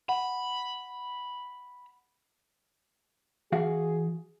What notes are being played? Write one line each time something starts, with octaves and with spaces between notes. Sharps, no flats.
F#5 B5
E3 F#4 G#4 F5